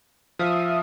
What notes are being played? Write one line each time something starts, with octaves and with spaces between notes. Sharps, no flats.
F3 E5 F5 D#6